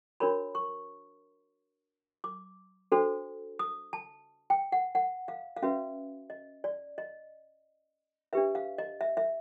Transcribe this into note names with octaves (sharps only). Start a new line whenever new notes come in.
D4 F#4 A#4 C#5 B5
C#6
D6
D4 F#4 A4 C5
D#6
A5
G5
F#5
F#5
F5
F5
C#4 F#4 B4 E5
D#5
D5
D#5
D4 G4 B4 E5
F5
D#5
E5
E5